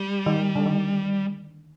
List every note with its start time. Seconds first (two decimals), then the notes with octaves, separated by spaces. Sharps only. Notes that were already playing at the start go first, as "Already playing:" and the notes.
Already playing: G3
0.26 D#3
0.56 D3
0.66 D#3